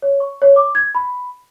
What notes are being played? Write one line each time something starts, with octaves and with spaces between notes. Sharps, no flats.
C#5
C#6
C#5
D6
G#6
B5